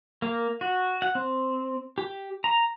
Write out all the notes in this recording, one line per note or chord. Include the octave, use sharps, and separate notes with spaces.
A#3
F#4
F#5
C4
G4
A#5